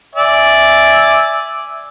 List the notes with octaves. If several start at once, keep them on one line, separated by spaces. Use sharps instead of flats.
D5 E5 G#5